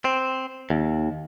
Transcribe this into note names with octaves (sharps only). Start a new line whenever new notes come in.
C4
D#2